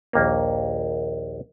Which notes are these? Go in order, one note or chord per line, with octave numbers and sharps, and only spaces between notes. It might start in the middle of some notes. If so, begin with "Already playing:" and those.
A#1 D#2 A#3